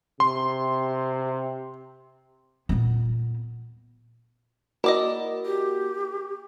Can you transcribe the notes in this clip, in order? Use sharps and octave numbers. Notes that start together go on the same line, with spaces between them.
C3 C6
A#2 B3
A#3 E4 F#4 A#4 D5 D#5
G4